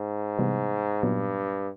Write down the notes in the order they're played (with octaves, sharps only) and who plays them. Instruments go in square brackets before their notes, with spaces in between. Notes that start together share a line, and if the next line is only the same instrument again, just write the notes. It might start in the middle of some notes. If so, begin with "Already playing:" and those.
Already playing: [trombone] G#2
[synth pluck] C3 E3 G3 B3
[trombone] G2 [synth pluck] A#2 F#3 B3 D#4